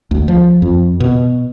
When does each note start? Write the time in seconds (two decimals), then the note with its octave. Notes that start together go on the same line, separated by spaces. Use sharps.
0.11 D2
0.28 F3
0.62 F2
1.00 B2